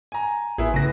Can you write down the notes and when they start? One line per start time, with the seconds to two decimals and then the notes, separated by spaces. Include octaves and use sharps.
0.12 G#5 A#5
0.58 A1 B3 E4 G#4
0.74 A2 C#3 B4 A#6